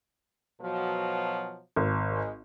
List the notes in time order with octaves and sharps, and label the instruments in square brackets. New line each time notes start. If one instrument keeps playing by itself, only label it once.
[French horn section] B2 F3 F#3
[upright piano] G#1
[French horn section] G#3